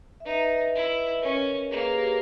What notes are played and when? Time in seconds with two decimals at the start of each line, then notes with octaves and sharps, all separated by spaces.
0.20 E5
0.25 D#4 B4 D#5
0.74 E4
1.22 C#4 A#4 C#5
1.70 A#3 G#4 B4
1.86 G#4
1.94 G4 A#4